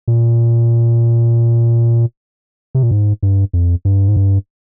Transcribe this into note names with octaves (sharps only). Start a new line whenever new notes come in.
A#2
C3
A#2
G#2
G2
F2
G2
G#2
G2